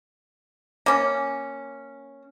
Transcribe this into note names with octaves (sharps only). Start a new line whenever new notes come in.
A#3 C#4